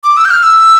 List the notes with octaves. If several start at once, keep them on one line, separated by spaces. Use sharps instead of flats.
D6
E6
G6
F6
E6